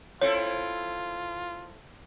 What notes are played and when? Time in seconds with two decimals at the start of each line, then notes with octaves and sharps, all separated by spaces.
0.22 C4 E4 F4 A4 C#5